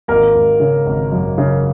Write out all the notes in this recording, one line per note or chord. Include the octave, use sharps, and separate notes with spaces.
G#1 A#3 A#4
G#1
C#3
G#1
F#2
C#3